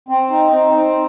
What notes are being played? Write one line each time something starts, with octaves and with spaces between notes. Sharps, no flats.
C4
D#4
C4
C4